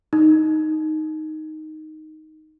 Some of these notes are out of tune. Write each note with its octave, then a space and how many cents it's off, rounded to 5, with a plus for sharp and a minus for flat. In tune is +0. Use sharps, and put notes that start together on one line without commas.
D#4 +0